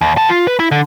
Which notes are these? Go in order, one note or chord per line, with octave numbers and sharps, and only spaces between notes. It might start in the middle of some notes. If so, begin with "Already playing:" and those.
D#2
B3 A5
F4
B4
E4
D3